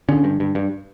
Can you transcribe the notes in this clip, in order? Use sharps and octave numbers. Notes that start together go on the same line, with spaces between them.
D3 C#4
G2
G2
G2